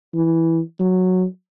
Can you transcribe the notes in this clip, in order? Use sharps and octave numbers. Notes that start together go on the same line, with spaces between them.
E3
F#3